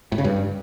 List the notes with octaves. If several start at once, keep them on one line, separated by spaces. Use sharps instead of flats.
A2
C#3
G2